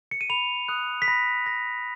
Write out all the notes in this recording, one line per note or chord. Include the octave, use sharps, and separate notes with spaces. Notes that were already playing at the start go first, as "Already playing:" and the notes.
C#7
D#7
B5 F7
D#6 F#6
B6
B5 A#6
D#6 F#6 A#6